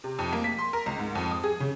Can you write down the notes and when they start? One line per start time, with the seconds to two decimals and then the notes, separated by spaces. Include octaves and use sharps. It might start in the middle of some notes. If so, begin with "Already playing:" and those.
0.04 C3
0.19 F2
0.32 A#3
0.44 B6
0.59 C6
0.73 A#4
0.86 C#2
0.99 G#2
1.15 F2
1.31 D#6
1.44 G#4
1.60 C#3